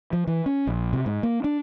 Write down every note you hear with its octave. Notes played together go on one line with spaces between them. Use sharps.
F3
E3
C#4
A#1
C3
G#2
A#3
D4